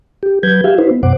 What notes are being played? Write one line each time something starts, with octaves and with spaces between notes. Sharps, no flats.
G4
F#3 B4 G6 G#6
F#4 G4 E5 F5
D#4 E4 F#4 B4 C5
B3
F#2 B2 C5 F#5 D6